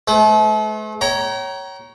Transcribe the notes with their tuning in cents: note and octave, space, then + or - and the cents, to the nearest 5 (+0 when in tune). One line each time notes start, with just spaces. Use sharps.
A3 -40 B4 +40
C#5 +0 G5 -40 A#5 +15